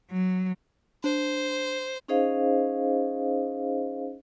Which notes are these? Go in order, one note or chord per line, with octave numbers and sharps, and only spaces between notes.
F#3
D4 C5
C#4 D#4 G#4 C5 D#5 F5